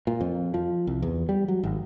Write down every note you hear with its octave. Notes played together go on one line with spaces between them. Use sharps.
A#2
F2
F3
C2
E2
G3
F#3
G#1